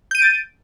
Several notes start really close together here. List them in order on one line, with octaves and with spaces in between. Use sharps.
G6 D#7 D7 A6